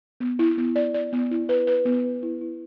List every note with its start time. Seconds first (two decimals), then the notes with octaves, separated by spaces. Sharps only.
0.20 B3
0.39 E4
0.58 B3
0.76 D5
0.94 D5
1.13 B3
1.31 E4
1.49 B4
1.67 B4
1.85 B3
2.04 B4
2.23 E4
2.41 E4